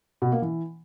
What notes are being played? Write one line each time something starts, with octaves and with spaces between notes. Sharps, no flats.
B2
A#3
E3